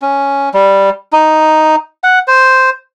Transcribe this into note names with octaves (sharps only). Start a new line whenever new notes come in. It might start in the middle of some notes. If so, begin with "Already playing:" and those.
C#4
G3
D#4
F#5
C5